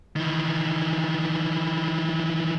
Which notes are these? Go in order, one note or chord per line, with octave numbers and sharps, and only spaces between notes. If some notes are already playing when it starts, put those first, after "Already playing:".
D#3 E3